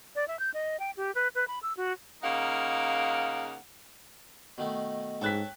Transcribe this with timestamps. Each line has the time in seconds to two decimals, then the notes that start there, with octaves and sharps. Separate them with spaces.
0.15 D5
0.28 E5
0.39 G6
0.54 D#5
0.80 G5
0.97 G4
1.15 B4
1.35 B4
1.48 B5
1.63 E6
1.77 F#4
2.23 C#3 A#3 D#4 F5 F#5
4.58 B2 D#3 A3 D#5
5.21 G#2 A4 C#5 G5 A5 F#6 B6